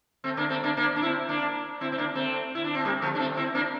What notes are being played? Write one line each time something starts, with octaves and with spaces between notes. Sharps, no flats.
A3 C4
A#3 D4
A3 C4
A#3 D4
A#3 D4
D4
C4 E4
A#3 D4
C4 E4
C4
A#3 D4
A3 C4
E4
D4
C4
G3 A#3
F3 A3
D4
A3 C4
C4 E4
A#3 D4